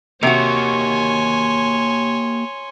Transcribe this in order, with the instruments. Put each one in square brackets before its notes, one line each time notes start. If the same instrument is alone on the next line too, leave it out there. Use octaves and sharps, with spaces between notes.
[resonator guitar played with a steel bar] C3 F#4 [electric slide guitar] A#3 G4 [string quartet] C#5 G#5 C6